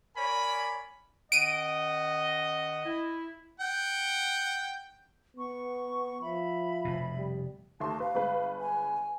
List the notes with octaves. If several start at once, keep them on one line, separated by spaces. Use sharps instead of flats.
A#4 C#5 D5 G#5 B5
D#3 C#4 D#5 F#5 D7 D#7
E4
F#5 G5
B3 C#6
F3 E5 B5
F1 B2
G3
D#2 A3 A5 C6
B4 F5
G1 G#3 B4
G#5